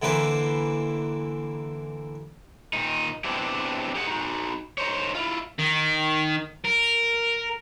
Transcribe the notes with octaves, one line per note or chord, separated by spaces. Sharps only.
D3 E3 A#3 B4 C5
A#2 D#3 D#4
B3 C4 D4 E4 G4
G4 G#4 F#5
D#4 F#4
D#4 A#4 C5 C#5
E4 F4
D#3
A#4